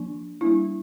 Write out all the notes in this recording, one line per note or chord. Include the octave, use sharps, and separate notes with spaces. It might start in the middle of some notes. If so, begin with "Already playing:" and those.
Already playing: F3 A#3 D4
G3 A#3 D4 E4